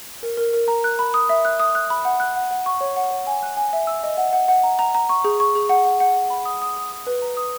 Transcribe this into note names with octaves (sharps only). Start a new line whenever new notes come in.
A#4
A#4
A#4
A#5
F#6
B5
D#6
E5
F#6
D#6
F#6
B5
F#5
F#6
F#5
F#5
C#6
C#5
F#5
C#5
G#5
F#6
G#5
E5
E6
D#5
F#5
F#5
F#5
A#5
A#5
A#5
C#6
G#4
C#6
G#4
F#5
F#5
F#5
F#5
B5
D#6
D#6
D#6
D#6
B4
A#5
D#6